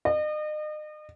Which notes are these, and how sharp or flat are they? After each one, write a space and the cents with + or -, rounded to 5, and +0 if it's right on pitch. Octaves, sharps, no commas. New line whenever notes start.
D#5 -35